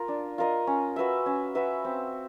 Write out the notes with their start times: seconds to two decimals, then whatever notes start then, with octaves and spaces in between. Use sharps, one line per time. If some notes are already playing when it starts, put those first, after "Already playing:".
Already playing: F4 A#4
0.08 D4
0.38 F4 A#4 D#5
0.67 C#4
0.96 F#4 B4 E5
1.26 C#4
1.55 F#4 B4 E5
1.85 C4